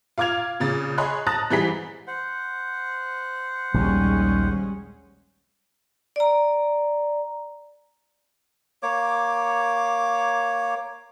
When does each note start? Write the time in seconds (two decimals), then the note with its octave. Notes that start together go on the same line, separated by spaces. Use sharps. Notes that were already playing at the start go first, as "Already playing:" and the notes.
0.18 F4 F5 D6 F6 G#6 F7
0.60 A#2 C#3 A6
0.98 G#4 C#5 D#5 B5 C6 F#6
1.27 A5 A#5 D#6 F#6 A6 A#6
1.51 G#2 E3 G3 G#4 B6
2.07 C5 F#5
3.74 A#1 D#2 D#3 G3 G#3 C#4
6.16 D5 A#5
8.83 A#3 C#5 D6